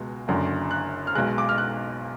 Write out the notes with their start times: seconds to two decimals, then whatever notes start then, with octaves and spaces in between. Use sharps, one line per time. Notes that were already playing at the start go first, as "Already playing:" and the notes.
Already playing: C#2 B2 G#3
0.28 F#1 F#2 D3
0.71 F#6
1.07 F6
1.15 B1 B2 G#3 F#6
1.38 D6
1.49 F6
1.58 F#6